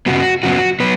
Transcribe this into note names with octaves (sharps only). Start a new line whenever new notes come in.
F#2 C#3 F#3 B3 F#4
F#2 C#3 F#3 B3 F#4
F#3 B3 B4